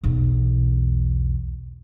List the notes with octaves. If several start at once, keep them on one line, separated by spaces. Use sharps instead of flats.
B1 E2